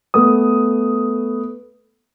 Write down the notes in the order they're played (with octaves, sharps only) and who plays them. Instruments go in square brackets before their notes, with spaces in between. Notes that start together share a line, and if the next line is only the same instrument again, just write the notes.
[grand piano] A3 B3 D#6